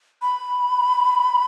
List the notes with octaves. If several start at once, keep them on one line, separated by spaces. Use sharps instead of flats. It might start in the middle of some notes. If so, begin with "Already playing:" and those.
B5